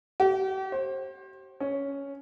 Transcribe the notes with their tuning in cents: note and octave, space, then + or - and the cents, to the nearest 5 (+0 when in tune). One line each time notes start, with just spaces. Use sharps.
G4 -40
C5 +30
C#4 +5